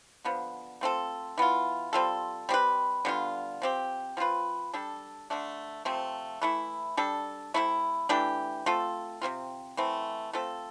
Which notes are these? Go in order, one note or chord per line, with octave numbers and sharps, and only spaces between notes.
D3 F3 B3
A3 C4 F4 A4
E3 B3 F4
G3 C4 F4 A4
G3 C4 G4 B4
D3 G3 B3 F4
F3 C4 G4
F3 C4 F4 B4
G3 D4 A4
D3 A3 D4
C3 F3 A3 C4
E3 A3 E4
G3 D4 A4
C3 F3 A3 E4
E3 A3 D4 G4
A3 C4 F4 A4
C3 G3 C4 F4
E3 A3 C4
A3 C4 F4 A4